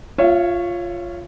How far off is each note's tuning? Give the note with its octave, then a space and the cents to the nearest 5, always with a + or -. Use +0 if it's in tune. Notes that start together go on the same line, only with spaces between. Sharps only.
F4 +0 C#5 +0 E5 +35